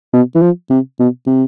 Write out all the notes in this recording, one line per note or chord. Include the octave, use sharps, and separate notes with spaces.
B2
E3
F3
C3
B2
C3